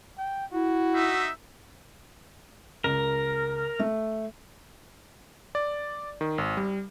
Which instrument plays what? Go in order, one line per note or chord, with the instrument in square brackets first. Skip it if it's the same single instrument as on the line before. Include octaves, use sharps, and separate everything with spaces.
[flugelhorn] G5
[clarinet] E4 [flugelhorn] F#4
[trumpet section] D#4 E5
[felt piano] C#2 [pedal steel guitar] A#4
[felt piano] A3
[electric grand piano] D5
D#3
G#1
G3